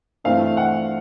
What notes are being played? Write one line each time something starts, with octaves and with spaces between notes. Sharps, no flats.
G2 E3 A3 C4 F5
F#5